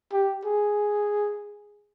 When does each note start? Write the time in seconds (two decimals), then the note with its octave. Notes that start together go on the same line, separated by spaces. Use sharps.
0.12 G4
0.45 G#4